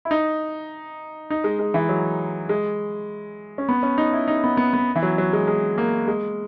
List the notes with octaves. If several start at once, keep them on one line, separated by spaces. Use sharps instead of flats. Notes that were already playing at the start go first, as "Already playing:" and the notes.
E4
D#4
D#4
G#3
G#3
E3
F#3
G#3
C#4
B3
C#4
D#4
E4
D#4
B3
B3
B3
E3
F#3
F#3
G#3
G#3
A#3
G#3